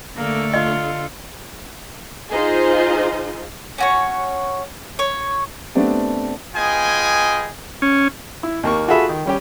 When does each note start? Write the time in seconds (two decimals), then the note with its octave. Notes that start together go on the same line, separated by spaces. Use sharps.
0.17 D3 A3 A#3 A4
0.54 F4 D#5
2.31 D#4 F4 G#4 C5 D#5
3.78 C#4 F#4 C#5
4.99 C#5
5.75 A3 B3 C4 D4 G4
6.55 B3 F4 G#4 D#5 G5 G#5
7.82 C#4
8.43 E4
8.63 D#2 A#3 C#6
8.88 F4 F#4 G#4 A4 E5 B5
9.09 D#3
9.26 G3 C#4 G4